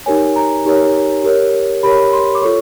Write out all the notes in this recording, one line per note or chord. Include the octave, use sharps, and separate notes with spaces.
D#4 G4 A#4 C#5 G#5
A#5
D#4 G4 A#4 C#5
G4 A#4 C#5
G4 A#4 C#5 B5
C6
D6
F4 A4 C#5 C#6